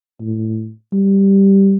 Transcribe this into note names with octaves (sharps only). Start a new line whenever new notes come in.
A2
G3